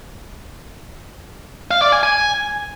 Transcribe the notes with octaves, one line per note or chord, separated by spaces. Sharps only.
F5
D5
G#5
G#5